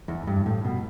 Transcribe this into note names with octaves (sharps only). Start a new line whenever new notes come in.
E2
G2
A2
B2